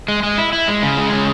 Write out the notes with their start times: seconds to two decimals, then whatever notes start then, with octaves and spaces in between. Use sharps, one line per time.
0.08 G#3
0.23 G#3
0.38 E4
0.53 E4
0.68 G#3
0.83 C#3
0.97 G#3
1.13 C#3